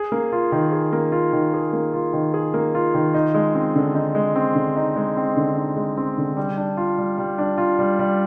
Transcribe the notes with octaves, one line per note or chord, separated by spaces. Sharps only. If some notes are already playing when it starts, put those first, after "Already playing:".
Already playing: G#4
A#3
F4
D#3
G#4
A#3
F4
D#3
G#4
A#3
F4
D#3
G#4
A#3
F4
D#3
D#4
G#3
C4
D3
D#4
G#3
C4
D3
D#4
G#3
C4
D3
D#4
G#3
C4
D3
G3
D4
F4
G3
G3
D4
F4
G3
G3